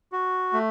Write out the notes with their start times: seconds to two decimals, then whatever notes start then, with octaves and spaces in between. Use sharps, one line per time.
0.12 F#4
0.53 A3